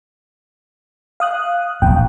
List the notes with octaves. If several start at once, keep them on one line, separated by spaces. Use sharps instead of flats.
F5 D#6 F#6
D#1 A#1 E2 G5